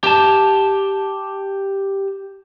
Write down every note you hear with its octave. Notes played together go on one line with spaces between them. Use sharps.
G4 A5